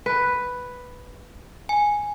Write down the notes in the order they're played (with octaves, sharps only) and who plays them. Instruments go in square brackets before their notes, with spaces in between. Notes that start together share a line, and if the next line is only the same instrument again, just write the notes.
[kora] B4
[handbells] G#5